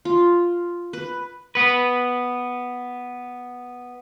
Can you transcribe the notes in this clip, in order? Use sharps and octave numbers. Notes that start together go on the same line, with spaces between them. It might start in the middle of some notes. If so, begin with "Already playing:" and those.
F4
B4
B3 B4